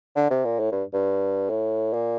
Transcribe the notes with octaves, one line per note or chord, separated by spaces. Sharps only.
D3
C3
A#2
A2
G2
G2
A2
A#2